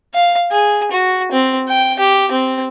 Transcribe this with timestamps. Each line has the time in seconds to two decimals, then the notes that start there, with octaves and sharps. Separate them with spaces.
0.14 F5
0.51 G#4
0.91 F#4
1.32 C4
1.69 G5
1.99 G4
2.32 C4